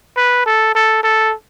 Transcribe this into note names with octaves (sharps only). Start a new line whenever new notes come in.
B4
A4
A4
A4